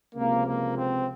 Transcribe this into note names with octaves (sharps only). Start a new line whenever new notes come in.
C#2 C3 F3 A#3
A#3
C4